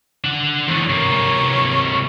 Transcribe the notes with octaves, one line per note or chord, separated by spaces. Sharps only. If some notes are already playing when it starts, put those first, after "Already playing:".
D4 F#5
E2 D3 C#5 C#6
C3 A#3